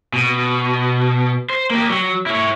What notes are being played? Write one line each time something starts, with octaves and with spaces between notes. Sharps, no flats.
B2
C5
A#3 G4
F#3
E4 C#5